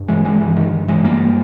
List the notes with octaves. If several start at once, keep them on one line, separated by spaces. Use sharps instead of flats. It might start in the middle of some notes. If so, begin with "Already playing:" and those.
Already playing: G2
E3 G#3
E3 G#3
G2 E3
D#3
E3 G#3
G2 G3 A#3